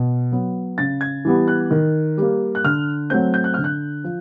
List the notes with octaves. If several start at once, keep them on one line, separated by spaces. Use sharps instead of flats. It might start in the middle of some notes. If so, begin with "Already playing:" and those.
Already playing: B2
F#3 B3
C#3 A6
G#6
E3 G3 B3
F#6
D#3
G3 A#3
F#6
D3 F6
F#3 A3 C4 G6
G6
F#6
D3 F6
F#6
F3